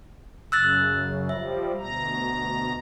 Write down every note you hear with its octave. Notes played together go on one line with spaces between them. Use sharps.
F#2 C#3 E6 F#6 A6
F3 G3 E5
D2 B2 A#5